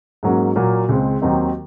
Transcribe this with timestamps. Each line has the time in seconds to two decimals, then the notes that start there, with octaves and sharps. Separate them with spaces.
0.23 G#2 F#3 A#3 C#4
0.56 A#2 F#3 A#3
0.89 C#2 C#3 G#3 C4
1.22 D#2 D#3 F#3 C4 D#4